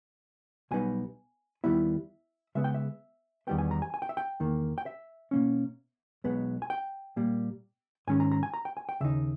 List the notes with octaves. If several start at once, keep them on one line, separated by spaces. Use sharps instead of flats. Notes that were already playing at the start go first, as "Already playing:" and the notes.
B1 B2 G3 B3 D#4 G#5
D#2 D#3 G3 B3 E4 E5
C#3 G#3 B3 E5
G5
E5
E2 D#3 G3 B3 G5
G#5
A#5
G#5
G#5
G5
E5
G5
E2 D#3 A#3
G5
E5
B2 A#3 C#4
B1 B2 G#3 B3
G#5
G5
A#2 G3 A#3
G#2 D#3 G#3 C#4 G#5
A#5
A#5
G#5
A#5
G5
G#5
G5
D#2 C#3 D#4 E5